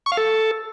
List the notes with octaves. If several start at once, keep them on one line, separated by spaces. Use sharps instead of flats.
C#6
F5
A4